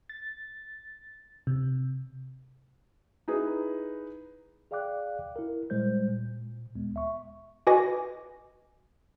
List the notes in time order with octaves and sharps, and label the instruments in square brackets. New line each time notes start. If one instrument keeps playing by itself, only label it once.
[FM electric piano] A6
C3
[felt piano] D#4 E4 G#4 B4
[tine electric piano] G#4 D5 F5 G5 D6 F#6
E4 A#4
A#2 G3 G#3 C5 G6
A#2
D2 G#3 B3
E5 C#6
[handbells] F#4 B4 D#5 G#5 D6 A#6